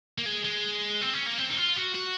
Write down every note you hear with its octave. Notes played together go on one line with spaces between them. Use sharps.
A#3
G#3
G#3
C4
C#4
A#3
C4
D#4
F4
F#4
F#4